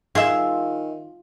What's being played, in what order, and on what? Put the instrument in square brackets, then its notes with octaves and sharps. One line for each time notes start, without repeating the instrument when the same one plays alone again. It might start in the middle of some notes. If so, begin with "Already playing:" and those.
[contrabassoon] D#3 [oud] F4 [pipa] G#4 E5